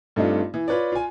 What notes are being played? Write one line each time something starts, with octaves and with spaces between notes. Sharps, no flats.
G2 A3 C4 D4 D#4 F4
E3
F4 B4 C#5 D5
F4 G#5